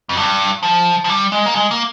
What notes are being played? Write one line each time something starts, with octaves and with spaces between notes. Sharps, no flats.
F2
G2
F3
F3
G3
G#3
A#3
G#3
A#3